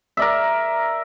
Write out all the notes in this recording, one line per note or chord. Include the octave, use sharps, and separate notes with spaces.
A#4 D5 E5